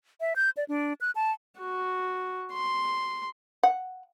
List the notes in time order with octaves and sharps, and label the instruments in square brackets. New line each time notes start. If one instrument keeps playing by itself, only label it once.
[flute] E5
G6
D5
D4
F#6
A5
[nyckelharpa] F#4
C6
[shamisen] F#5